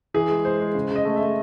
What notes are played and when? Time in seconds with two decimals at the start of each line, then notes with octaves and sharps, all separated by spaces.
0.14 E3 G#4
0.29 G#3
0.45 G#3 C5
0.60 G#3
0.75 C#3
0.90 C#3
0.96 D#5
1.05 A3
1.16 A3 E5